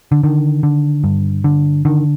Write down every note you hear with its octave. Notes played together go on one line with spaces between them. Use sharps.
D3
D3 D#3
D3
G2
D3
D3 D#3